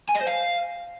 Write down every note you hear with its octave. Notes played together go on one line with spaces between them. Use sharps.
G#5
D#5
C5
F5